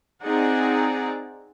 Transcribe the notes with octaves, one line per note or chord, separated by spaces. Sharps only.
C4 D#4 G#4 D5 F#5 A#5